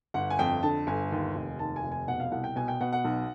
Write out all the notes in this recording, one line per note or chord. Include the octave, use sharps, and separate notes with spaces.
G1 F#5
G#5
F2 G5
D3 A5
G1 G#5
D#2
F1
D#2 A5
G#5
F1
G#5
B2 F#5
F5
C2 F#5
G5
B2 G#5
G5
B2 F#5
F#5
B1